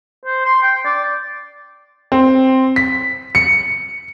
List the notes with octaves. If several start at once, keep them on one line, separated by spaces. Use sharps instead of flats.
C5
C6
G5
D5
C4
B6
C#7